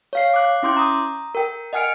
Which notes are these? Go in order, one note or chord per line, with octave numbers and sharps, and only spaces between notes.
C#5 F5 C7
D6 F#6
C#4 E4 C6 D6 G6
A#5 D#6
A#4 G5
D#5 F#5 G#5 F6 C#7 D7